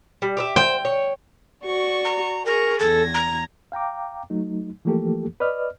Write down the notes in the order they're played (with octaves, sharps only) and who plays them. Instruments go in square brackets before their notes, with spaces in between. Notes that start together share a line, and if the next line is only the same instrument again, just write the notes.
[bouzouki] G3
G4 B4 E5
[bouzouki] C5 [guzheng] G5
[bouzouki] C#5
[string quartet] F#4 D5 C#6
[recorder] A#5
[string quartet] G#4 C#6 [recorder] A#4
[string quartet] E2 G#6 A#6 [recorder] A4
[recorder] A#5
[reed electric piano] F5 G5 A#5 D6
F#3 A3 D#4
E3 F3 A3 A#3 G4 A4
B4 D5 D#5 F6